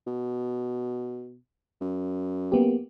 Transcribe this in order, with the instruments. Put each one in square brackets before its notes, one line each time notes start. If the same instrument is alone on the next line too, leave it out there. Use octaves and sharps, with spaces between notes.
[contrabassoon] B2
F#2
[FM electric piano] A#3 B3 G4